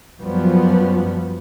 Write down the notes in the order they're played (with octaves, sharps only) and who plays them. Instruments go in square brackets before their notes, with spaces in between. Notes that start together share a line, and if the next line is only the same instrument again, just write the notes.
[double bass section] F#2 F3 [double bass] G3 B3